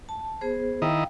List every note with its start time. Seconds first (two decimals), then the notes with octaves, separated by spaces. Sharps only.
0.09 A5
0.41 B3 G#4 C5
0.82 D#3 E4 D#5 F5 G5